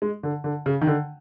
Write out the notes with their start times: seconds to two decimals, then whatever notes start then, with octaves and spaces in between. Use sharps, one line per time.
0.02 G#3
0.23 D3
0.44 D3
0.66 C#3
0.81 D#3
0.87 D3